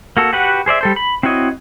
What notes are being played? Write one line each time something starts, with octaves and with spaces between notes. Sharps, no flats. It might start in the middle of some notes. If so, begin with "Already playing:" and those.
A#3 F#4 A4
F#4 G4 B4 F#5
G#4 C5 D5 E5
G3 A4 C5
B5
C4 E4 F#4 C#5 D#5